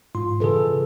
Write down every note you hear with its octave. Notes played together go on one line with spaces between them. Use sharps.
G#2 F4 C6
A#2 C#3 E3 G#4 A4 B4